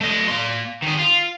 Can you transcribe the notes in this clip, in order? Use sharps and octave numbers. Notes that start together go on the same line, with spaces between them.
A3 D#5
A#3 C6
D#3 G#4
F4